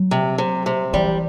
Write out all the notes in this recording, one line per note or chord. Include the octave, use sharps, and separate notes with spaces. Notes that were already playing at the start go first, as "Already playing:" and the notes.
Already playing: F#3
C3
C3
C3
E3 G3